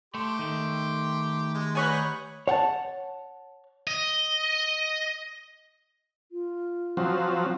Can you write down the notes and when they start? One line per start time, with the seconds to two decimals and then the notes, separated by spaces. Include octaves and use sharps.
0.14 A3 G4 C6
0.39 D#3 A3
1.55 G#3
1.75 G3 D#4 B4 C#5 F#5 G#5
2.48 C#5 F#5 G5 A5
3.87 D#5
6.32 F4
6.97 F3 F#3 C4